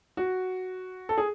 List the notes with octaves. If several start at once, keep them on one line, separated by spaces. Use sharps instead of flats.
F#4
A4
G#4